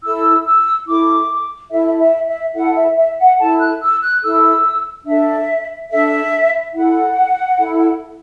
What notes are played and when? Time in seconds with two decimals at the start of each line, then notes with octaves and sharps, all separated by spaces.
0.03 E4 A4 E6
0.45 E6
0.86 E4 A4 D6
1.70 E4 A4 E5
1.99 E5
2.27 E5
2.54 E4 A4 F#5
2.75 E5
2.96 E5
3.18 F#5
3.38 E4 A4 A5
3.59 F#6
3.81 E6
4.01 F#6
4.23 E4 A4 E6
5.06 D4 A4 E5
5.90 D4 A4 E5
6.74 E4 A4 F#5
7.58 E4 A4